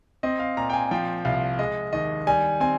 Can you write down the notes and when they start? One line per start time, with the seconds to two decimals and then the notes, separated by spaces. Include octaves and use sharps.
0.23 C4 D#5
0.39 F5
0.57 A#2 A#5
0.70 G5
0.73 G#5
0.91 F3 G5
1.25 C2 F5
1.59 G#3 D#5
1.93 D#2 D#5
2.27 G3 G#5
2.60 C4 G#5